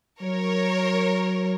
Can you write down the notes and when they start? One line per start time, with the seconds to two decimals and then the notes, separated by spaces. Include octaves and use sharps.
0.21 F#3 A#4 C#5